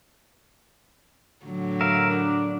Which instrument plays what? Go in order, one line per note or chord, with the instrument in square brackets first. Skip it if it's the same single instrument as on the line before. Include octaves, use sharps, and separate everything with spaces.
[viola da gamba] A2 D3 F#3
[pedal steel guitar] A#4 E5 F5
D4